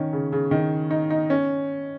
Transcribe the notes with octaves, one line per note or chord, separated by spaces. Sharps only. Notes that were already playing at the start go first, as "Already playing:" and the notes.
Already playing: D#3 C#4
C#3
C#3
D#3
D#4
D#4
C#4